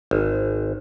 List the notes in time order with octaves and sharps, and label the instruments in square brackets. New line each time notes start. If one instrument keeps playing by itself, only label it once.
[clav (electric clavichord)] G#1